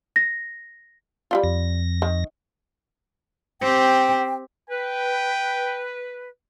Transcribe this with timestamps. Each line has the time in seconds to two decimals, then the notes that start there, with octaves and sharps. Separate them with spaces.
0.16 A#6
1.31 G3 E4 F4
1.44 F2 A#6
2.02 D#3
3.62 C4 G4 G5
4.70 B4 G5